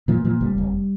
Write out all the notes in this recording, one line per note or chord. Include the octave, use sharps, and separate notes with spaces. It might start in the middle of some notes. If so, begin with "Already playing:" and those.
A#2 F3
A#2 F3
F1 G3
F1